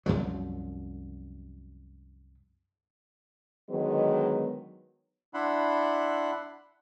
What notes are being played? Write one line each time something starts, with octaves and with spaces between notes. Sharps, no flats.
C2 F#2 F3 F#3
D3 D#3 F#3 G#3 B3
D4 E4 F#5 B5 C6